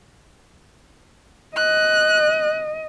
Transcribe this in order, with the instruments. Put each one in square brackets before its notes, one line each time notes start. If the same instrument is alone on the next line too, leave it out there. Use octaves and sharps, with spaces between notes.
[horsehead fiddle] D#5 [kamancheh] F#6